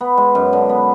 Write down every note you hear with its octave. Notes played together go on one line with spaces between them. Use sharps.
B3
G#3
F#2
D3
B3